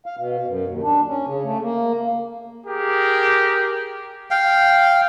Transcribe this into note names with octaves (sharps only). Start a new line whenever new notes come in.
F5
B2
F#2
D#2
D4
C#4
C#3
A3
A#3
G4 G#4 A#4
F5 G5